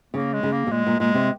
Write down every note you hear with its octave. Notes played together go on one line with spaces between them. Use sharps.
C#3 A#3
G#3
C#3
A#3
C3
A#2 G#3
A#2
A#2 G#3
C3